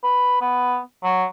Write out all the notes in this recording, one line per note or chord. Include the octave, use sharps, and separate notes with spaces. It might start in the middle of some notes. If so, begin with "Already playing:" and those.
B4
B3
F#3